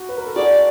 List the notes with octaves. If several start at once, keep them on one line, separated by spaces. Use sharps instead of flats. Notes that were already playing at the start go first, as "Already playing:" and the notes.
Already playing: F#4
B4
A#4
A4
F#4 G#4 D5